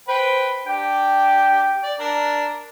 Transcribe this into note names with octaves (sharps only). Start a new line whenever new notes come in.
B4 C5 G5 B5
D4 G4 G5
D5
D4 A#4